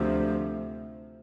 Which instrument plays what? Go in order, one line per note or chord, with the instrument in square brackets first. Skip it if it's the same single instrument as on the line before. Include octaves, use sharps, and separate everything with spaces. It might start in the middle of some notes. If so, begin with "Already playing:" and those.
Already playing: [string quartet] D2 C3 F3